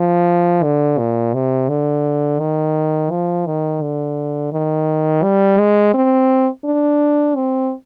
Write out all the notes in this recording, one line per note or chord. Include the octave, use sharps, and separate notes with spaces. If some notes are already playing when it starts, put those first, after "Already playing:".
Already playing: F3
D3
A#2
C3
D3
D#3
F3
D#3
D3
D#3
G3
G#3
C4
D4
C4